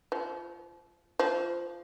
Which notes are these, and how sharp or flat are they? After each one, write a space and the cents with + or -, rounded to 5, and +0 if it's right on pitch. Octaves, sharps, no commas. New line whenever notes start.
F3 -20
F3 -15